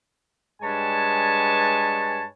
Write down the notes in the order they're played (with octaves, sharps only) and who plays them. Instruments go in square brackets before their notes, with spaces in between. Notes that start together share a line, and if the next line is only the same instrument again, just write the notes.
[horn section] G2 G#3 B4 C#5 G#5 A5